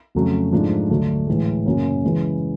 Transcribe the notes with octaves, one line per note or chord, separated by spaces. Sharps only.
F2 C#3 F#3 A3
G#2 F3 A3 D4
D2 D3 F#3 A3 D4
A2 E3 G#3
F#2 C#3 F#3 A#3 C#4
C#3 E3 G#3